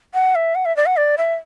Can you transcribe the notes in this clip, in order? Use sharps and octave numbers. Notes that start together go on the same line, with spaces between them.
F#5
E5
F#5
E5
D5
F#5
D5
E5